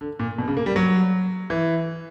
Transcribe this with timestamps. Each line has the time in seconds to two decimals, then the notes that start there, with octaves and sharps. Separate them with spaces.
0.01 D3
0.19 A#2
0.38 B2
0.48 C#3
0.57 A#3
0.66 G3
0.76 F#3
1.50 E3